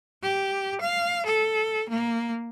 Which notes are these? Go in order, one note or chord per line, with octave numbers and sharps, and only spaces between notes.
G4
F5
A4
A#3